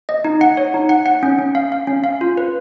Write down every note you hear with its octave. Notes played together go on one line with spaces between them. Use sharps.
D#5
D#4
F#5
C#5
D#4
F#5
F#5
C#4
C#4
F5
F5
C#4
F5
F4
B4